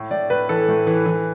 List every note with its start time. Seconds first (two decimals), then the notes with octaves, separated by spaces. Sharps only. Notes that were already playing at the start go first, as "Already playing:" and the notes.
Already playing: A2
0.11 A2 D5
0.30 A2 B4
0.49 E3 A4
0.68 A2
0.87 E3
1.06 E3